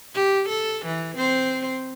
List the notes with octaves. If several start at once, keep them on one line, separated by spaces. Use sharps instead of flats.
G4
A4
E3
C4 C5